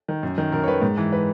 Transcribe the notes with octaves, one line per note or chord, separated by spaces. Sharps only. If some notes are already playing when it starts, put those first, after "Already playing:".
D#3
F#2
D#3
F#2 A#4
C#5
D#3 B4
G#2
E3
B4